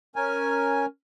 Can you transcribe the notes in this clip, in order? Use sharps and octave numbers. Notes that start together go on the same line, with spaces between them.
C#4 A#4 G#5